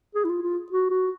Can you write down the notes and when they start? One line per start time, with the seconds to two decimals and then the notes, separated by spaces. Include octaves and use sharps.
0.15 G#4
0.24 E4
0.29 F4
0.42 F4
0.72 F#4
0.90 F#4